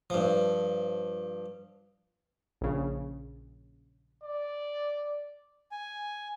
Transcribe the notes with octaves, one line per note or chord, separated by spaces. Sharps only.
G2 F3
A#1 C#3
D5
G#5